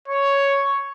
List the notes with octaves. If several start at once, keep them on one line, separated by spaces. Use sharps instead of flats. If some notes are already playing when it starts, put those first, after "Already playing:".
C#5